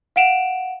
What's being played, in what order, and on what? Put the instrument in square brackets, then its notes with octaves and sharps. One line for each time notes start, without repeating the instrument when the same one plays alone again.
[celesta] F5 F#5 D7 E7 F7